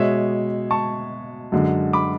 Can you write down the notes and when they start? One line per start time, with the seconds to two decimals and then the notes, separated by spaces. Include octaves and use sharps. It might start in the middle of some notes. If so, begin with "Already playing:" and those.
Already playing: B2 G#3 C#5 E5
0.71 A5 C#6
1.52 F#2 D3 G#3
1.93 B5 D6